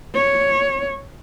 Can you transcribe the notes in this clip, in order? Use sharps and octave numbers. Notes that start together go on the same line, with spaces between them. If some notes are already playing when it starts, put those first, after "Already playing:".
C#5